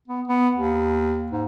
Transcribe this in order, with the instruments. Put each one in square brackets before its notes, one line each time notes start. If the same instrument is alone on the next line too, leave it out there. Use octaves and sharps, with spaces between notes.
[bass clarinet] B3
B3
D#2
G#2